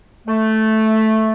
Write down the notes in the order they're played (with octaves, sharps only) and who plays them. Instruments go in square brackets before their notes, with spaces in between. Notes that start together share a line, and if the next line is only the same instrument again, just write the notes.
[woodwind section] A3